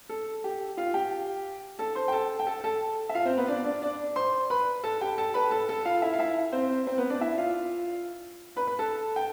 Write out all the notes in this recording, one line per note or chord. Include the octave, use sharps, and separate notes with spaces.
A4
G4
F4 F5
G4 G5
A4 A5
C5 C6
G5
A4 A5
G5
A4 A5
A4 A5
E5
F4 F5
C4 C5
B3 B4
D4 D5
D4 D5
D4 D5
C5 C6
B4 B5
A4 A5
G4 G5
A4 A5
B4 B5
A4 A5
A4 A5
F4 F5
E4 E5
F5
E4 E5
C4 C5
C4 C5
B3 B4
D4 D5
E4 E5
F4 F5
B4 B5
B4 B5
A4 A5
G5